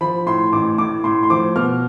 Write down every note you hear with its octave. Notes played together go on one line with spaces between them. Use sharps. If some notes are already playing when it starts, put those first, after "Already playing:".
F3 B5
A2 C6
A1 D6
A2 D6
A2 C6
C6
F3 D6
B2 F6